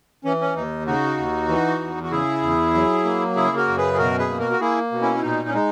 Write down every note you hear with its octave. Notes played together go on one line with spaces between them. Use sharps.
E3 C#4
C#4
D#2 D#4
C#3 D#4 F#4
D#2
E3
E2
F#4
C#3 E4 G#4
E2
F#3
A#3
C#3 E4 G#4
F#4 A#4
F#2
G#4 B4
G#4
B2 F#4 A#4
G#4 B4
A#3
F#4 A#4
F#4
A#3 E4 G#4
B2
C#4 E4
E4
A#2 D#4
C#4
G#3 D#4